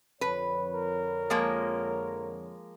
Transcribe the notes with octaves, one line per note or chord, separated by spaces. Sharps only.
F2 D3 B4 C#5
A#4
F3 G#3 A#3